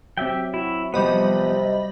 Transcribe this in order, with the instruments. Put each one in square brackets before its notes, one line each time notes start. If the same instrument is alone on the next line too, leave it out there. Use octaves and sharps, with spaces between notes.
[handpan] F#3 C4 [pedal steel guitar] G4 E5 G5
[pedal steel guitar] E4 [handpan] F#4
[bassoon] C3 [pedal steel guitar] F3 B3 [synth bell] G3 D#5 B5